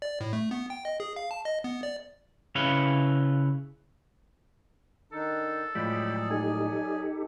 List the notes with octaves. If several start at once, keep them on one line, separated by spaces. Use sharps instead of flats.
D5
A2
A3
B3
G5
D#5
G#4
F5
A5
D#5
B3
D5
C#3 E4 B4 C#5 F5
D#3 D4 D#4 A4
A2 F3 F#3 G#3 G#4 D5 G5 B5
D#4 G4 A4 G#5